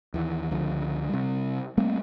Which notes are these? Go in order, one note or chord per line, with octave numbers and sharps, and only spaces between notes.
D#2 E3
C#2 D3 F3
C3 G3
G3 A3 A#3 C4